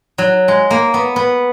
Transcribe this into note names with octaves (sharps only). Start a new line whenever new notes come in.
F#3
G#3
A#3
B3
B3